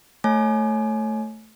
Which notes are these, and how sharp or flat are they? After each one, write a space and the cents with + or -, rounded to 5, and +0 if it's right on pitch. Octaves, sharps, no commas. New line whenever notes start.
A3 +0 C#5 -10 G#5 +25